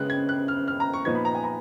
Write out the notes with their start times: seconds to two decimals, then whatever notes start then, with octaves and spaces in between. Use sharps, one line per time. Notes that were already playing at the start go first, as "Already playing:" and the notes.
Already playing: C#3 G#3 B3 F#6
0.10 G#6
0.29 F#6
0.48 F6
0.68 F6
0.80 A#5
0.94 C#6
1.05 A#2 F3 B3 D#4 G#6
1.15 B5
1.25 A#5
1.35 G#5
1.44 A#5